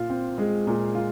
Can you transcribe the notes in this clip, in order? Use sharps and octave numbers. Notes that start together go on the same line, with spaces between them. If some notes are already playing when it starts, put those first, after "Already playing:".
Already playing: A#2 F4
C4
G#3
A#2
F4